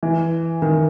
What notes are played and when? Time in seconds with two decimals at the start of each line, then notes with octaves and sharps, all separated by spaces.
0.03 E3
0.62 D#3